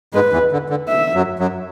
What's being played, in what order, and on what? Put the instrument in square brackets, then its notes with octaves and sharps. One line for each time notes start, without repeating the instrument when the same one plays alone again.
[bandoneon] G#2 G#3 [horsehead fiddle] B4
[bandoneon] E2 E3
D3
D3
[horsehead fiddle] E5
[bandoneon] F#2 F#3
F#2 F#3